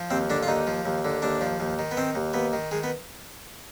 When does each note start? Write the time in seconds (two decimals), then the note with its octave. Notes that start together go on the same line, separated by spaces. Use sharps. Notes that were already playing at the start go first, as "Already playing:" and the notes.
Already playing: F3
0.10 D#2 C4
0.30 D3 D4
0.43 F4
0.48 D#2 D#4
0.67 F3
0.86 D#2
1.05 D3
1.22 D#2 D4
1.41 F3
1.60 D#2
1.79 D#3
1.91 B3
1.97 D#3 C4
2.15 D#2
2.33 D#2 B3
2.53 D#3
2.71 D#3 G#3
2.83 B3